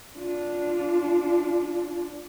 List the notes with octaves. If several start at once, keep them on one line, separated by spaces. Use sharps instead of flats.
D4 F4